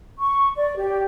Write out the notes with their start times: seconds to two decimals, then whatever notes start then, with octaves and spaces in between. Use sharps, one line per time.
0.20 C#6
0.56 D5
0.76 G4